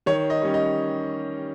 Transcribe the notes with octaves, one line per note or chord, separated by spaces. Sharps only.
D#3 C#5
D#5
G3 C#4
D#5